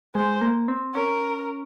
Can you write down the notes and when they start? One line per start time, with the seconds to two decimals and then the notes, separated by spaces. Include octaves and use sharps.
0.15 G#3 C5
0.41 A#3
0.68 C4
0.95 C#4 A#4